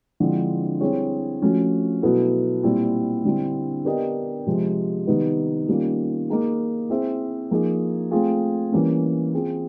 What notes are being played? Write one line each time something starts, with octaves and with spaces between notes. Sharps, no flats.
D3 F3 G#3 C4 E4
G3 C4 E4 G#4 C#5
F3 A3 C#4 F#4
B2 F#3 B3 E4 A4
A#2 G3 C4 E4 G4
D3 G3 C4 E4
B3 D4 G4 A#4 D#5
C3 F3 G#3
C3 D#3 G3 B3
D#3 G3 A#3 C#4 F4
A#3 D#4 G#4
C4 E4 G#4 C5 E5
F3 A#3 D#4 G#4
A3 C4 F4 G#4
E3 G3 A#3 C#4
C4 F4 G#4